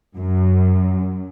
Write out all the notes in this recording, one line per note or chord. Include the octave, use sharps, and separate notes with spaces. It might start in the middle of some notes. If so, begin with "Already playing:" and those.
F#2